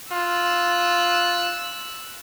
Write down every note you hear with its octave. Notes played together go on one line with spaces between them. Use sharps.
F4 E6 F#6